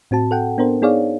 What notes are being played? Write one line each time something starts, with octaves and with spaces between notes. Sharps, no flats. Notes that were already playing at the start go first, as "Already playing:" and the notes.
A2 C4 F#4 A5
A4 F#5 G5
B3 D4 A#4 C5
B3 D#4 G#4 C#5 D5 F5